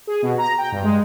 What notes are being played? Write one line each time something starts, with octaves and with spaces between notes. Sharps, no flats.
G#4
B2
A#5
G5
G2
G#3